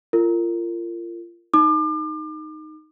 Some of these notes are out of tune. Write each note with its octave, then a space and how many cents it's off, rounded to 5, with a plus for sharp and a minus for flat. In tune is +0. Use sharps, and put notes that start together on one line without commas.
F4 -30 A#4 -30
D#4 +0 D6 +35